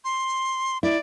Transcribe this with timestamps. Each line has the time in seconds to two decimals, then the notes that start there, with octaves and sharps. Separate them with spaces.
0.04 C6
0.83 E4 D5